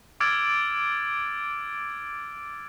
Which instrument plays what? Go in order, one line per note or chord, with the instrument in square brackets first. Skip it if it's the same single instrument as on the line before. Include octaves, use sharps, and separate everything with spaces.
[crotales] D6 E6 F6 G#6 A6 D7